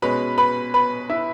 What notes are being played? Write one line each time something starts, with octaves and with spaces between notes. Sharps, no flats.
B2 G#3 C#4 B4 B5
B4 B5
B4 B5
E4 E5